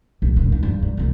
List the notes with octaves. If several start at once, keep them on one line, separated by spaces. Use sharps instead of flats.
A#1
E1
D#2 E3
G2
G2 G3
C2 A3